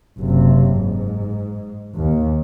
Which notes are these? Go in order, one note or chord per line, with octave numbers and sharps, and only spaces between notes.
F#1 C3
G#2
D#2